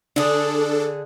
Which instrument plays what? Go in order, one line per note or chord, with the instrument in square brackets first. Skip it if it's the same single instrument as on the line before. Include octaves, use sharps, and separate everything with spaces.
[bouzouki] D3 G#4 [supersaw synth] D4 A4